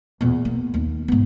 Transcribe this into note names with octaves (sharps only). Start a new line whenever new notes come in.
E2 A#2
A#3
D#2 D#4
G#2 B3